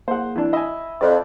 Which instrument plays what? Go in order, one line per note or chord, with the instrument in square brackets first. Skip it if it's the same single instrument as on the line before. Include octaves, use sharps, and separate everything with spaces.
[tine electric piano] A#3 G#4 [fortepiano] C5 F#5
[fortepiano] E3 D4
[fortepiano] D#5 G#5 [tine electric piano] E5 B5 E6
[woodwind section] F2 [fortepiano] D5